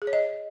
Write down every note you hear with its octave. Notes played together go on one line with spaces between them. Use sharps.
G#4
C#5
D#5